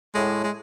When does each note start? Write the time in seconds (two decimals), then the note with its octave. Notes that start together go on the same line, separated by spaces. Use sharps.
0.14 A2 G#3
0.44 G#3